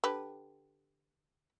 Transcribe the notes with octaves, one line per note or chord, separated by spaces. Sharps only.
D3 G4 B4